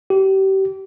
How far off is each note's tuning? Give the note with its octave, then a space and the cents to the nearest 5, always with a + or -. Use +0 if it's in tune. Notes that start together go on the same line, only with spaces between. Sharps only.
G4 -30